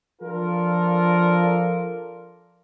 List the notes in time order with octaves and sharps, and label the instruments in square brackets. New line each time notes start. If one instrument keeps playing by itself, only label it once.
[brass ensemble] F3 D4 F4 A4 A#4